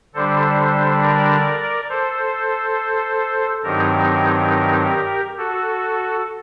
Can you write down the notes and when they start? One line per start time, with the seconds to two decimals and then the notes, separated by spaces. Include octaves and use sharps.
0.14 D3 G3 D4 A4 C5
1.02 A#4 D5
1.89 A4 C5
3.64 G2 D#3 F#3 C4 D#4 G4 A#4
5.38 F#4 A4